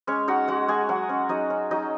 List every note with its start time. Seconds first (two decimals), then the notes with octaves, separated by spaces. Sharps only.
0.07 G#3 C#4 C#5
0.28 D#4 F#4 F#5
0.48 G#3 F#4 F#5
0.68 G#3 G#4 G#5
0.89 F#3 F#4 F#5
1.09 C#4
1.29 F#3 D#4 D#5
1.50 C#4
1.71 F#3 D#4 D#5